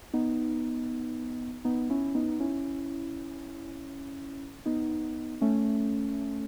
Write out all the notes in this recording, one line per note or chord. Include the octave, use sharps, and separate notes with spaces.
B3 D#4
B3 D#4
C#4 E4
B3 D#4
C#4 E4
B3 D#4
A3 C#4